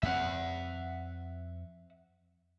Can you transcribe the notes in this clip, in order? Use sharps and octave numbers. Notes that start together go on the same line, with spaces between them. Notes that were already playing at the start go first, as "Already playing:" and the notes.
F2 A#3 C4 E5 F#5